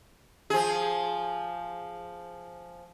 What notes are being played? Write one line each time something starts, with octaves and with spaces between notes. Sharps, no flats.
F3 G#4